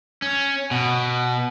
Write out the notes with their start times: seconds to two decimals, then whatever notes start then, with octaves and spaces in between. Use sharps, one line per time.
0.22 C#4
0.71 B2